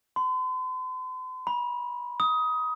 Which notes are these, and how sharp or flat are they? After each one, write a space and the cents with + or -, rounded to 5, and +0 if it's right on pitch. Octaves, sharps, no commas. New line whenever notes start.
C6 -45
B5 -35
D#6 +15